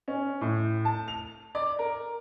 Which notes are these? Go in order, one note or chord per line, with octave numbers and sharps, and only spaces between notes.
C#4
A2
A5
F7
D5
A#4